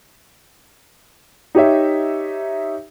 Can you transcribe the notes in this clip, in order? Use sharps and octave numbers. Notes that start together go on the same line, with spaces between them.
D#4 G4 C#5 E5